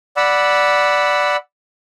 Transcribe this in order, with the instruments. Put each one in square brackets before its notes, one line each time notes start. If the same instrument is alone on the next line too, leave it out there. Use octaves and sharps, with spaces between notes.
[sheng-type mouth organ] D5 F#5 B5 E6